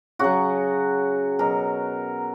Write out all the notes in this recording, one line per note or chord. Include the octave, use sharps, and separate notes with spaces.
C#3 F#3 F#4
B2 F#3 A#4